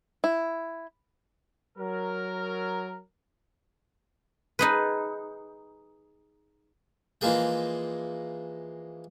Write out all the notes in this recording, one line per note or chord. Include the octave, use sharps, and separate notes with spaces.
E4
F#3 A#4
D#4 G#4 B4
E3 F3 G#3 A#3 G#4 G5